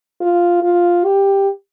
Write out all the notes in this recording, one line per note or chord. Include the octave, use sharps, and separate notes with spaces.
F4
F4
G4